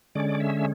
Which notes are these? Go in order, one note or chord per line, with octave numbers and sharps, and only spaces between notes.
D3 G#3 C#4 D5
E5